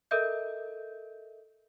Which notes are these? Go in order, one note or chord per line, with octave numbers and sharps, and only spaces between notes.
A4 A#4 D#5 E5 G6